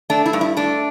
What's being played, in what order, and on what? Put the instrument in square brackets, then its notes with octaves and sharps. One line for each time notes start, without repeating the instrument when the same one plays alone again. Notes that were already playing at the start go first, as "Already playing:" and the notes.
[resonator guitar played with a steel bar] A3 D4
E4
G2
E4
A3 D4